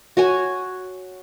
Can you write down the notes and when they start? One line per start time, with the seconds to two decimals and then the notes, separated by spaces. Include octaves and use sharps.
0.17 F#4 C#5 G#5